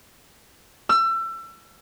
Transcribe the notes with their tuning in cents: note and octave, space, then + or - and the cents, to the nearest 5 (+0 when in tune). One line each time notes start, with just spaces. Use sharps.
E6 +30